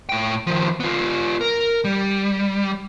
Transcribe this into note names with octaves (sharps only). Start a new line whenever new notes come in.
A2 G5
D#3 F3
B3 F4
A#4
G3